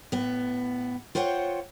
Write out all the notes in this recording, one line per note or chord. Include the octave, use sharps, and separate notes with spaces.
A2 B3
F4 C5 C#5 F#5 G5